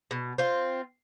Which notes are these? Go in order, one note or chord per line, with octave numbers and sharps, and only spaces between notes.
B2
C4 F4